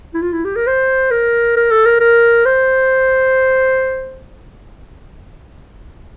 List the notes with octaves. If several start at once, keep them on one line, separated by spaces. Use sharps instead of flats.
E4
F4
E4
G4
A#4
C5
A#4
A#4
A4
A#4
A#4
C5